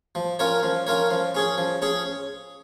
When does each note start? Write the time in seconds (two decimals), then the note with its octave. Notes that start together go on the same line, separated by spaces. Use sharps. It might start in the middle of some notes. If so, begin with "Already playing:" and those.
0.15 F3
0.39 C#4 F4 A#4 C#5
0.63 F3
0.87 C#4 F4 A#4 C#5
1.11 F3
1.35 C#4 G#4 C#5
1.58 F3
1.82 C#4 G#4 C#5